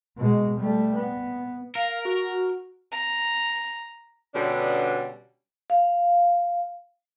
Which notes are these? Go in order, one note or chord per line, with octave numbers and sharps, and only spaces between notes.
B2 G#3
G3 A3
B3
A#4 F5
F#4
A#5
B2 D3 G3 B3 C#4 D4
F5